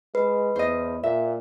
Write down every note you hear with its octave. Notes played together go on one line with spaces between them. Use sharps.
G#3 B4
E2 C5 D#5
A#2 E5